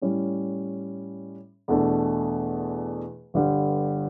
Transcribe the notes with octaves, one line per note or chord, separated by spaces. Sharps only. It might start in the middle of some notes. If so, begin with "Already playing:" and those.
A2 G3 C#4
E2 B2 A3 D4
G1 G2 D3 G3